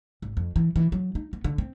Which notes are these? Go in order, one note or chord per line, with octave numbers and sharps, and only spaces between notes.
G#1
F2
E3
E3
F#3
D#4
B3
D3
C4